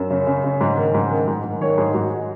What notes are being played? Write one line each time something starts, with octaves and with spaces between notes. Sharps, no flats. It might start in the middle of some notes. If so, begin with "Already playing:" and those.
Already playing: F#2
C#3
C#3
C#3
G#2
D#3
G#2
D#3
G#2
G#2
D#3 C#5
G#2 G#4
G#2 F#4